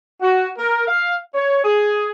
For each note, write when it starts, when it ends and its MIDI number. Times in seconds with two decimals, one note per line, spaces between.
0.21 0.48 66
0.58 0.82 70
0.87 1.15 77
1.34 1.61 73
1.65 2.10 68